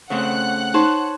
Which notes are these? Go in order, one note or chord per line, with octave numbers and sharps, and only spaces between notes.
C#3 A3 C4 F#5 F#6
D#4 C5 C#5 A5